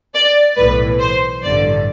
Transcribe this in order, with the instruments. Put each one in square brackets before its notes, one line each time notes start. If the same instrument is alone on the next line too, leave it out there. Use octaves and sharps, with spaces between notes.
[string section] D5
B1 A2 E3 B4
C5
A1 G2 D3 D5